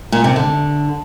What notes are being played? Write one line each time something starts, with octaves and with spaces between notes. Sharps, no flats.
A#2
C3
D3